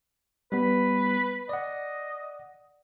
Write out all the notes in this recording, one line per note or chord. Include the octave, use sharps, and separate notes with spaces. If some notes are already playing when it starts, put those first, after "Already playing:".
G3 B3 B4
D5 D#5 F#5